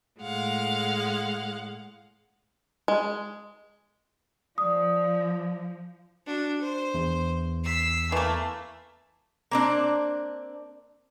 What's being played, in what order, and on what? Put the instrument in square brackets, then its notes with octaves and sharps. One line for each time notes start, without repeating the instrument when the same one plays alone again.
[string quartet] A2 G#3 F5 F#5
[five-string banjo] G#3
[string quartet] F3 [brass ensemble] D5 [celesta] D#6
[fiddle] D4 F#4
C5
[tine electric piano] E2
[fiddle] E6 [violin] B6 C7
[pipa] E3 A#3 [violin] A3
[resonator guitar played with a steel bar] A#3 C4 D4